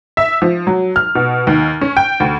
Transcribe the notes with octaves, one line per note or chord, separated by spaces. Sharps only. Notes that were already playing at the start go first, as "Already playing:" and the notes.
E5
F3
F#3
F6
B2
D#2
C#4
G5
D2